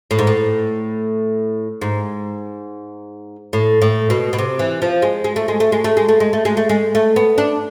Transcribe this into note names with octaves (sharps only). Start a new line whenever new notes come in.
A2
G#2
A2
G#2
A2
A2
B2
B2
C3
E3
F3
G#3
G#3
A3
G#3
A3
G#3
A3
G#3
A3
G#3
A3
G#3
A3
G#3
A3
B3
D4